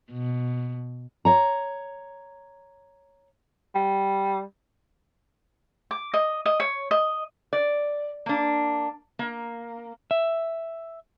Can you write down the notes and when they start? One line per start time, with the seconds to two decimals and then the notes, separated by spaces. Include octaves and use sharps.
0.11 B2
1.25 C#5 A#5
3.75 G3
5.91 D6
6.14 D#5
6.46 D#5
6.60 C#5
6.91 D#5
7.53 D5
8.26 A#3 D4
9.19 A#3
10.11 E5